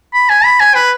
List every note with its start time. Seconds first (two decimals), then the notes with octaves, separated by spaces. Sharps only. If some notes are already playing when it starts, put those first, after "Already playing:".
0.14 B5
0.29 G#5
0.44 B5
0.60 G#5
0.75 B4